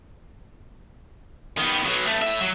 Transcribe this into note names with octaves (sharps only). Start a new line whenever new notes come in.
D#3 B3
B2 F#3
A3 B3
A2 E5
F#3